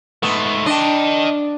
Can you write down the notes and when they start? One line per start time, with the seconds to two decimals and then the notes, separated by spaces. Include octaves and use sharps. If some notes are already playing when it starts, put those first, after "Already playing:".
0.23 G#2 A3 B3
0.66 D4 D#5 G5